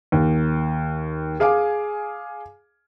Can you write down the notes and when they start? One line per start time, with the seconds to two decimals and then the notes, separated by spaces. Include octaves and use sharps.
0.12 D#2
1.40 G#4 F5 G#5 D6